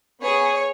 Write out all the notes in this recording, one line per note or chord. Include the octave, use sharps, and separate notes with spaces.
B3 G#4 C#5